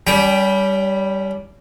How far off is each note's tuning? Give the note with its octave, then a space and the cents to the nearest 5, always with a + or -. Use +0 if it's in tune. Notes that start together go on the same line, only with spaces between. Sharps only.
G3 +0 C#4 +40 G5 +5